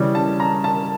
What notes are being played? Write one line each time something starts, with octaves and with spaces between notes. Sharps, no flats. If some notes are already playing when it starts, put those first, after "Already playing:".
Already playing: C#3 E3 G3
A5
A#5
A5